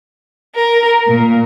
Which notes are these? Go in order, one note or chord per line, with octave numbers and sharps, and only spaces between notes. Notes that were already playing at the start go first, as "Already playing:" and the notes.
A#4
A#2